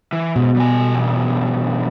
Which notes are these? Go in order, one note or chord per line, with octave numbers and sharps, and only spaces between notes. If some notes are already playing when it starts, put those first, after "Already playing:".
E3
G#2 B2
G3 G#5
E2 G2